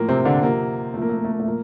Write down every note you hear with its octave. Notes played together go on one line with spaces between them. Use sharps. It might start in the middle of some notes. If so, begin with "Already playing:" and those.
Already playing: A2 F3 A#3
C3 C4
D3 D4
C3 F3 A#3
A#2 F3 A3 A#3
A3
A#3
A3
A#3
A3
A#2 F3 A#3